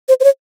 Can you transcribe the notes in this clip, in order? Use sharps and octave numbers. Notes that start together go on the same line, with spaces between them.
C5
C5
C#5